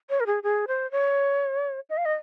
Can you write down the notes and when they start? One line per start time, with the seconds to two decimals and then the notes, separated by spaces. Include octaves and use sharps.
0.10 C#5
0.20 A#4
0.27 G#4
0.43 G#4
0.68 C5
0.91 C#5
1.90 D#5
1.97 F5
2.05 D#5